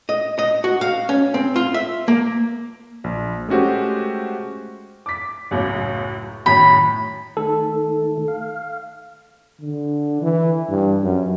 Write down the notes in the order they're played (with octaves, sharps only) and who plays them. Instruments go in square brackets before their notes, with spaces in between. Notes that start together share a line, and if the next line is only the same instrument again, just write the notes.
[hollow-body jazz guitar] D#5
D#5
F#4
F5
C#4
C4
F4
E5
A#3
[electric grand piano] A#1
G#3 A3 C#4 F#4 G4 C5
[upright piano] D6 B6
C#2 F#2 A2
[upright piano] F#2 A2 D#3 [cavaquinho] B5
[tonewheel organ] D#3 A3 [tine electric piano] A4
[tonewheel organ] F5
[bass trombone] D3
E3
G2
F#2